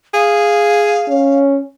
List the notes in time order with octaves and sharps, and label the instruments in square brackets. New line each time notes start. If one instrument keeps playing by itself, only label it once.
[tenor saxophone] G#4 [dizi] F5
[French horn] C#4